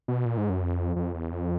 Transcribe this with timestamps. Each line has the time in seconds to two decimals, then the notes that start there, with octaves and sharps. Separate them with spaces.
0.08 B2
0.25 A#2
0.37 G#2
0.49 F#2
0.62 F2
0.96 F2
1.14 E2
1.32 F2